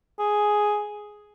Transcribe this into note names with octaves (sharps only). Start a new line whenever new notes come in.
G#4